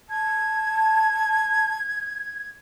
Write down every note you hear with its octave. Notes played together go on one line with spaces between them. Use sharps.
A5 G#6